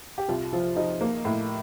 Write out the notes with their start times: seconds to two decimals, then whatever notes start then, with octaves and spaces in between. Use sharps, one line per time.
0.18 G4
0.28 C2 F4
0.53 F3 F4
0.76 F3 D#4
1.01 A#3
1.25 A2